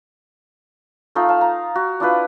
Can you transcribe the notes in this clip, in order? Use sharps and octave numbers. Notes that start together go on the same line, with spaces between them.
A3 D#4 F4
F5 A5
A#5
F#4
D4 E4 F4 B4